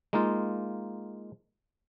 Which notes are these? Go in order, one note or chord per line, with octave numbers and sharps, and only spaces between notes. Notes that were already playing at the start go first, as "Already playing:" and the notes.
G#3 A#3 D#4 F4